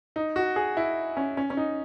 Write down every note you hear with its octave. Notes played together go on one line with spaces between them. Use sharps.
D#4
F#4
G#4
E4
C#4
C#4
C#4
D#4